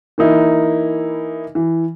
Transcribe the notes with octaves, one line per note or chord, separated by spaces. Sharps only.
E3 A#3 D#4 E4
E3